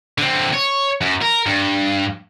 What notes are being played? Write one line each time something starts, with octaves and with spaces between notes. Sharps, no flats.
D3 C4
C#5
F#2
A#4
G2